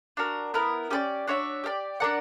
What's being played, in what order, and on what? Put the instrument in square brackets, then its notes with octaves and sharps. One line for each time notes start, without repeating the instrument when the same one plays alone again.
[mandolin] D4 F#4 A#4
B3 E4 A#4
C#4 G4 B4 D5
D4 F#4 C#5 E5
G4 A#4 D5
D4 A#4 D5 F#5